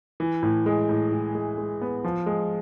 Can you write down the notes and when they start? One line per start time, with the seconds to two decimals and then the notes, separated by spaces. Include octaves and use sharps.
0.20 E3
0.43 A2
0.66 G#3
0.89 A2
1.12 A2
1.35 G#3
1.58 G#3
1.81 B3
2.04 F3
2.26 G#3